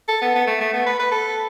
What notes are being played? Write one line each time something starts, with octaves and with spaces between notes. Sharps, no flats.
A4
B3
B3
A3
A3
B3
B4
B4
A4